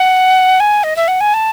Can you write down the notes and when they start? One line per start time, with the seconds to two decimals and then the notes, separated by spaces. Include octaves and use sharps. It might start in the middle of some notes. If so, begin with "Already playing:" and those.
Already playing: F#5
0.60 G#5
0.84 D#5
0.96 E5
1.08 F#5
1.21 G#5
1.34 A5